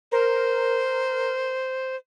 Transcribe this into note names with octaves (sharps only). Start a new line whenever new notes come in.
A#4 C5